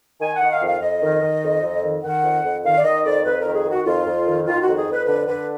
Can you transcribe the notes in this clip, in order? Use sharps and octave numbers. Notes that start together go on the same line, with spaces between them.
D#3 G#5
F#5
D#3
F5
F2
F5
F2 D#5
D#3
D#3
F2
F2
D#3
D#3 F#5
F2
F2
D#3 F5
D5
D#3 D#5
F2 D5
F2 B4
D#3 A#4
G#4
D#3 F#4
F2 F4
F2
D#3
D#3 F4
F#4
F2
G#4
F2
B4
D3 B4
D3 B4